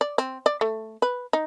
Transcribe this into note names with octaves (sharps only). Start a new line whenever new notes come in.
D5
C4
D5
A3
B4
D#4